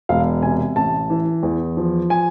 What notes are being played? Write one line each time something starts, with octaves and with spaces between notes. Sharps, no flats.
E1 F5
C3 G#5
A1 A5
E3
E2
F3
G#5